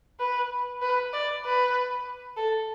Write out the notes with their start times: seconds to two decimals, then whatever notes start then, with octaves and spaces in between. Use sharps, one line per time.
0.20 B4
0.82 B4
1.13 D5
1.45 B4
2.37 A4